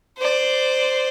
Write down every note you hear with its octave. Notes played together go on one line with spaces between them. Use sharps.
C5 D5